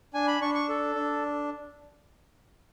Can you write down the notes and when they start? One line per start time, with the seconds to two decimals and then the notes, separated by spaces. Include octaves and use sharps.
0.14 D4 G#5
0.27 B5
0.41 D4 C#6
0.54 C#6
0.69 A4
0.95 D4